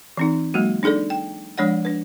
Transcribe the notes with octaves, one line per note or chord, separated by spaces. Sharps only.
E3 C4 D#4
F#3 G#3 A#3 F#4
D4 D#4 G#4 A4 D5
G5
F3 G#3 D4 C#5 D5 F#5
D4 B4